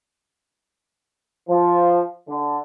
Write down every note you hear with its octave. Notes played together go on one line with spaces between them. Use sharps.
F3
D3